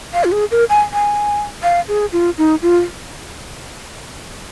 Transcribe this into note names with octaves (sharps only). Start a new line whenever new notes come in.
F5
F4
G#4
A#4
G#5
G#5
F5
G#4
F4
D#4
F4